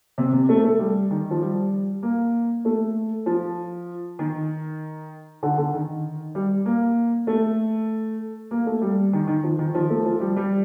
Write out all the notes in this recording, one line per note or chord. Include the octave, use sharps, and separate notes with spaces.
C3
C3
A3
A3
G3
D#3
F3
G3
A#3
A3
F3
D#3
D3
D3
D#3
G3
A#3
A3
A#3
A3
G3
D#3
D#3
F3
D#3
F3
A3
F3
G3
G3